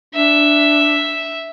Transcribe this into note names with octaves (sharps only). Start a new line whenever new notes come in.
D4 E5